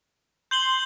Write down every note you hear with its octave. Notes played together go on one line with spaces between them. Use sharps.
C6 G6 F#7 G7